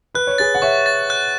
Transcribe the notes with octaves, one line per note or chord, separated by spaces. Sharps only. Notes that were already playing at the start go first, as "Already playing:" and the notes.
B4 F#6
C#5
G#4 B4 A6
F#5
C#5 E5 C#6
A6
F#6